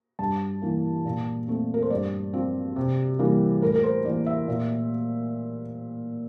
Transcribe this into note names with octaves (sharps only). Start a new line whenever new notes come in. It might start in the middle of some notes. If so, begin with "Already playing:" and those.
G2 A5
E3 A#3
A#2
A3 C4
A#4
C5
G2 D5
F3 C4
C3
E3 G3 A#3
A2 A#4
A#4
C5
E3 A#3 D5
E5
A#2